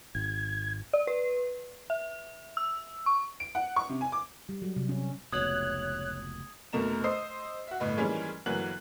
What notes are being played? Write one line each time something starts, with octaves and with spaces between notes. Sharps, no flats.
G#1 G#6
D5
B4
E5
E6
C#6
D7
F#5
C#6
C3
G#5
D6
G3
F#3
C3
C#4
F1 C#2 B2 C#5 D#6 F#6 G#6 F#7
F1 B2 A3 A#3 A#5 E7
C5 D#5 D#6 E6 C7
F#4 E5
G1 A2 B4 D#5
D#3 E3 G3 G#3 A#3 C#4
G1 E3 F#3 A#3 F#6 F#7